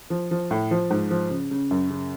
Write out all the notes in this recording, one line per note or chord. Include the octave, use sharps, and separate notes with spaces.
F3
F3
A2
F3
G#2
F3
C#3
C#3
F#2
C#3